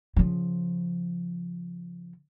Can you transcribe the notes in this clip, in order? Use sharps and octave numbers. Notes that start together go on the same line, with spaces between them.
C#3 F3